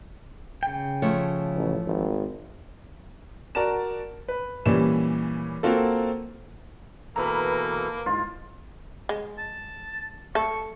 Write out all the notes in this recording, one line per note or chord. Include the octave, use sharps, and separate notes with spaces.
C#3 G5
F3 A3 C#5
A1
G#1
F#4 A#4 D5 A5 A#5 E7
B4
A#2 E3 G3 C#4 E7
A#3 C4 F4 F#4 A4
B2 E3 A#3 A4 B4 A#5
G#2 F4
G#3
A5
A3 A4 C#6